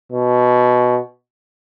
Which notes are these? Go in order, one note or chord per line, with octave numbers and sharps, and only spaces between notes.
B2